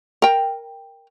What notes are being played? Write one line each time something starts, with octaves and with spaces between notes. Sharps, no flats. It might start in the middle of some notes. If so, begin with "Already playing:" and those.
A#4 G5